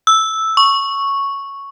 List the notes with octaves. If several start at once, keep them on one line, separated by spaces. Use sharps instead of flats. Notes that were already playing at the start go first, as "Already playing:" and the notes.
E6
C#6